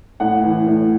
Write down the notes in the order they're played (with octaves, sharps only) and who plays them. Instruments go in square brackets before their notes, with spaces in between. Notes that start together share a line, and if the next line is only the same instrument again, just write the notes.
[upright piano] A2 F#5
E3
A2